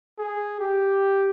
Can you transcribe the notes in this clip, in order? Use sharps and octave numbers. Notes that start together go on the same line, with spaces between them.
G#4
G4